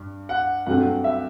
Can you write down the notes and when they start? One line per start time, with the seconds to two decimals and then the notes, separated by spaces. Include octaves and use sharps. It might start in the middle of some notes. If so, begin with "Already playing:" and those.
Already playing: G2
0.29 F#5
0.66 G2 F#3 A3 C4 F#5
1.04 E5